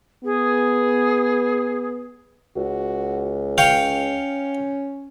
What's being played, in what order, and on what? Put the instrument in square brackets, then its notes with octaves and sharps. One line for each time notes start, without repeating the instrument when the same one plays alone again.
[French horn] B3 [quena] G#4
[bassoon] C#2 [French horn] F#4
[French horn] C#4 [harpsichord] C#5 F5 G5